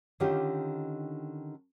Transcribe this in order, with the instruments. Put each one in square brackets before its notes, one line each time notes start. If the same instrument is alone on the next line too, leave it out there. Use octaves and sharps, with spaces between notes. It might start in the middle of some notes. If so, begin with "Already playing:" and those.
[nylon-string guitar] D3 D#3 C#4 D#4 F4 G4